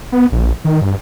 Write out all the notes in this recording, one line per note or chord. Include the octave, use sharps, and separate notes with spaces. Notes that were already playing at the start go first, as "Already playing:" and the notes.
B3
A#1
D#3
G2